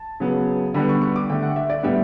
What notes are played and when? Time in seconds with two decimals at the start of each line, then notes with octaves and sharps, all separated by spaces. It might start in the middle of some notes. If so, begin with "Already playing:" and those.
Already playing: A5
0.20 C#3 F#3 B3
0.74 D3 G3 B3 B5
0.89 C#6
1.02 C#6
1.16 D6
1.30 D3 A3 G5
1.43 F#5
1.56 E5
1.70 D5
1.83 A2 G3 B3 E5